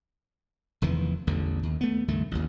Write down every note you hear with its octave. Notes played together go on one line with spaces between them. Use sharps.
F1 E2 D#3 E3
A1 E2 D3
D#2
A3 B3
C#2 G2 D#3 A3
A1 D#2